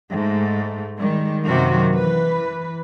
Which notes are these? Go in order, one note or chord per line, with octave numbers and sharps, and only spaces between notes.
G#2 A3
D#3 G3 G#3
F#2 C3 D#3 F#3 A#3 F#4
E3 B4